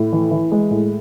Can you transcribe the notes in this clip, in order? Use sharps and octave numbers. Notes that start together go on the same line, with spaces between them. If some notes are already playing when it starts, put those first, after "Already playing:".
Already playing: A2
E3
E3
G#3
A2